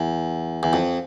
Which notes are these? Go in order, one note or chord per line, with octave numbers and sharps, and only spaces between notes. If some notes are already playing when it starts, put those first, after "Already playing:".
Already playing: E2
E2
F2